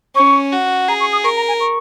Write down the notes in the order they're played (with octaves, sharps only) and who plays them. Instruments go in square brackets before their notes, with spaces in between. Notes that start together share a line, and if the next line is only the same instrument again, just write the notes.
[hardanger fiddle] C#4 [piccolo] C#6
[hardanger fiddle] F#4
[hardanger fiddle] G#4 [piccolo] A#5
[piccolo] C#6
D#6
[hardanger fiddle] A#4 [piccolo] C#6
[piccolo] A#5
G#5
C#6